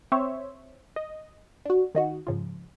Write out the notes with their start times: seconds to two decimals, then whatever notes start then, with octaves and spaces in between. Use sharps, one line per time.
0.12 C4 C5 C#5 E5
0.96 D#5
1.65 D4 F#4
1.95 D#3 D#4 F#4
2.27 G#2 C#3 F3